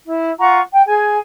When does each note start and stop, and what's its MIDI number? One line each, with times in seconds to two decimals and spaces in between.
0.06 0.29 64
0.39 0.59 65
0.39 0.59 78
0.39 0.59 82
0.39 0.59 85
0.72 0.82 79
0.86 1.17 68
0.86 1.17 80